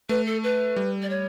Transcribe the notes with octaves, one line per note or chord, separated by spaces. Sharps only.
A3 B4
A4
B4
G3
D5
C#5